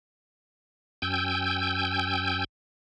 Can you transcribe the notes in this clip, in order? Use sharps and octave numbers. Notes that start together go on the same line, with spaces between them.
F#2 G5 G#5 E6 G6